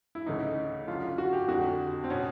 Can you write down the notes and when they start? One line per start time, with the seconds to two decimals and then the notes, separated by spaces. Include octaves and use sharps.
0.15 E4
0.26 D2 C#3 E3 D#4
0.88 F#2 D3 F4
1.03 F4
1.18 F#4
1.33 G4
1.48 F2 D3 F#4
2.04 C4
2.10 B2 C#4